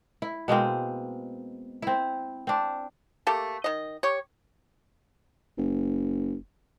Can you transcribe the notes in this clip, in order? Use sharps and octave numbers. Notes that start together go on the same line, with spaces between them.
E4
B2 G#3 A#3 C4
C4 E4
C4 D4
A3 A#3 G4 A4
D#3 D#5
G4 C#5
F#1